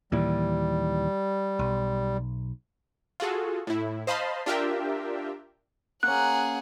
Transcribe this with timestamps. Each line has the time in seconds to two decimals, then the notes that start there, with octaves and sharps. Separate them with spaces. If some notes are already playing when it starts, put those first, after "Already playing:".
0.12 D#2 A#2 E3 G3
1.59 B1
3.20 F4 F#4 G#4 A4
3.67 A2 E4
4.07 C5 D#5 F5 A5 B5 C6
4.46 D4 F4 G4 A#4 E5 G5
6.03 A#3 C#4 G#4 F#5 F#6